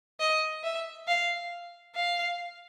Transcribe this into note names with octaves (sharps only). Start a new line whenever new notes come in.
D#5
E5
F5
F5